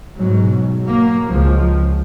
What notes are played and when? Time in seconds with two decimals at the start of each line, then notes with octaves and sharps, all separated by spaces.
0.16 G#2 B2 F#3
0.83 F#3 A#3
1.27 C#2 F3